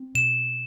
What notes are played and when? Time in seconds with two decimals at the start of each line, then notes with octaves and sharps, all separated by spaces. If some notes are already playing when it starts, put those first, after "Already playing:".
Already playing: C4
0.15 B2 E7